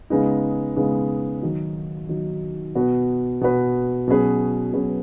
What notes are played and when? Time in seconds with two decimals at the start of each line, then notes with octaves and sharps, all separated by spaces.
0.10 C#3 G#3 B3 D#4
0.76 C#3 G#3 B3 D#4
1.42 D#3 F#3 D#4 F#4
2.08 D#3 F#3 D#4 F#4
2.75 B2 B3 F#4 B4
3.41 B2 B3 F#4 B4
4.08 B2 F#3 C#4 G#4 B4
4.73 B2 F#3 C#4 G#4 B4